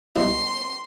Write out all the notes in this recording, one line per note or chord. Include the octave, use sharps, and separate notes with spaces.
C2 B2 E4 C6